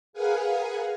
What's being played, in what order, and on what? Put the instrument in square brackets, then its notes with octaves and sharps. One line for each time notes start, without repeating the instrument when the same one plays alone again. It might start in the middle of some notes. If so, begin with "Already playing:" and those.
[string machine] G#4 A#4 B4 F5 F#5 G#5